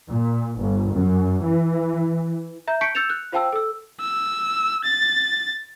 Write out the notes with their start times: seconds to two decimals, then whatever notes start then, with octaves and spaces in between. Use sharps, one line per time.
0.10 A#2
0.61 G1
0.94 F#2
1.45 E3
2.67 E5 A#5 G6
2.81 A5 C#6 G6 B6 C#7 D7
2.95 E6 G6 A6 C#7 E7 F7
3.10 F#6
3.32 F4 C5 F5 G5 A5 E6
3.52 A4 E6
4.01 E6
4.85 A6